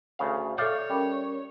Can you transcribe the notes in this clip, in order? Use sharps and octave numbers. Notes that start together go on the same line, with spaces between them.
D2 C#3 F5
A4 C#5 D5 E5 F5 G6
G3 C#4 A#4